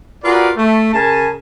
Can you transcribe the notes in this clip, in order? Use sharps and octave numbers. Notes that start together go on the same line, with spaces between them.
F4 F#4 G#4 A#4 B4 D5
A3
C#3 A#4 G#5 A5